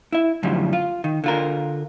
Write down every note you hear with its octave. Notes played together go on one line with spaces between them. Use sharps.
E4 E5
F#2 A2 D3 F3 G3
F4
D#3
D3 F4 A#4